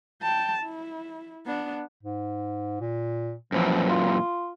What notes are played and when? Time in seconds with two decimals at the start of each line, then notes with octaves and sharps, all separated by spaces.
0.22 G5 A5
0.62 E4
1.46 B3 D4
2.03 G#2
2.81 A#2
3.52 F#2 A#2 E3 F3
3.90 F4